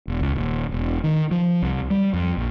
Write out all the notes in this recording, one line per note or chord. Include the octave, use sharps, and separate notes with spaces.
E1
C#2
D#1
E1
D#3
F3
C2
G3
F2
A#1